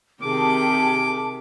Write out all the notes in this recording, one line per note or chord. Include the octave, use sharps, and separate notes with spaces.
C3 D#3 G4 G#4 A5 D6